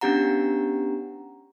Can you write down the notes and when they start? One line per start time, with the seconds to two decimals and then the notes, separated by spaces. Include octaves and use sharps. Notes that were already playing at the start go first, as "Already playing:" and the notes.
0.01 B3 C#4 D4 G4 F#5 A#5